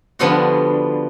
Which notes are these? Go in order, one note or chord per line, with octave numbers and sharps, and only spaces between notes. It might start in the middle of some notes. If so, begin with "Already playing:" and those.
D3 F3 G3 B3 F4 F#4